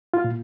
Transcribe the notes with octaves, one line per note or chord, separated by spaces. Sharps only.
F4
A#2